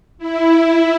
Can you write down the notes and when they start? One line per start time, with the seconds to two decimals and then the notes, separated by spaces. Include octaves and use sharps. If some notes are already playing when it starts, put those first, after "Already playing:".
0.18 E4